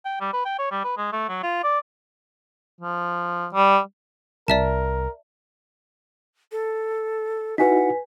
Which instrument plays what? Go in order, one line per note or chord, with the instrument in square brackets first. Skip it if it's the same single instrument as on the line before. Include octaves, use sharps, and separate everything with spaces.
[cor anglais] G5
G3
B4
G5
C#5
G3
B4
G#3
A3
F#3
F4
D5
F3
G3
[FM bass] C2 [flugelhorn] A#4 [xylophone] D5 E5 A5
[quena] A4
[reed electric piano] D#4 E4 F#4 [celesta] B4 G#5 B6 [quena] F#5